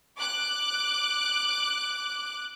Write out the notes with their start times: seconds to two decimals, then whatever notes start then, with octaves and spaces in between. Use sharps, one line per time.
0.18 D6 F#6